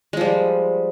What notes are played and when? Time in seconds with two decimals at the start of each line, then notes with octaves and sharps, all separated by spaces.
0.13 G#3
0.17 F3
0.21 G3